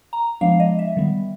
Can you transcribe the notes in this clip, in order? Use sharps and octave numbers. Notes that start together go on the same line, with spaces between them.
A#5
F3 G#3 B3 D4 F5
D#5
E5
D#3 G3 B3